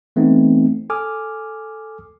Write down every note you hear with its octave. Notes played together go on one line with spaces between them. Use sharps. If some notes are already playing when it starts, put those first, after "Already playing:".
E3 A3 B3 C4 D#4
A4 G#5 D6 D#6 F6